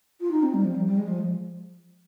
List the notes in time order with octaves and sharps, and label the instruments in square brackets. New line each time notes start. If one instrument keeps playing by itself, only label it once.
[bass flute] F4
D#4
C4
G3
F3
G3
G3
G#3
F3